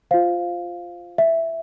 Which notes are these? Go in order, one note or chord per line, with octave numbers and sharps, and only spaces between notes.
F4 C5 F5
E5